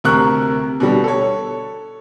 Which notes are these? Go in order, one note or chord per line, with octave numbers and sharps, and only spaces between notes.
D2 C3 A#4 C#6 F#6
B2 D3 G3
A4 C#5